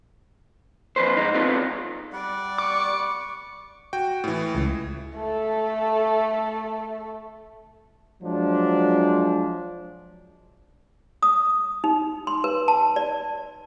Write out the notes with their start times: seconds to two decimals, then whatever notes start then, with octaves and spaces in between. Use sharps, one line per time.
0.96 F2 B4 C5
1.17 G#2 G#3 D#4
1.35 B3 C4 D#4 F4 A4 B4
2.13 G3 D5 F#5
2.58 C#6 D6
3.93 F#4 G5
4.24 A2 E3
4.55 C#2
5.15 A3 A4
8.22 F3 F#3 G#3 D4
11.22 D#6
11.84 D#4
12.27 C6
12.44 B4
12.68 A5
12.96 D5